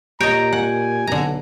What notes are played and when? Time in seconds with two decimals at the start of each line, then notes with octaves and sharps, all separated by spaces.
0.21 A#2 G4 C#5 D#5 A#5 G6 D7
0.53 F#5 G#5
1.07 B1 D3 A#5